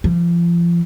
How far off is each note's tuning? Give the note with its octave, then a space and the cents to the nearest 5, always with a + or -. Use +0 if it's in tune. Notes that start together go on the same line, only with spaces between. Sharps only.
F3 -30